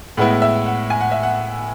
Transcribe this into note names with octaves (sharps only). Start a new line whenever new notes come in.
A2 G#3 B3 E4 F#5
E5
F#5
G#5
F#5
E5
F#5